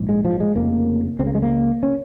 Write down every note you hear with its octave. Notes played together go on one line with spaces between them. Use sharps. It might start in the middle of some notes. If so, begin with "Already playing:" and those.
Already playing: A#1 G#2
G#3
F3
G#3
F1 F2 C#3 A#3
C#2 C#3 C4
A#3
G#3
A#3
C#4